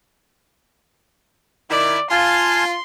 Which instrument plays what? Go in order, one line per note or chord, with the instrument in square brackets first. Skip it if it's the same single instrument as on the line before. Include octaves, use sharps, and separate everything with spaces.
[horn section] D#3 E4 [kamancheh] D5
[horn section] F4 [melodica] F5 G#5 A5 [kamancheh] C6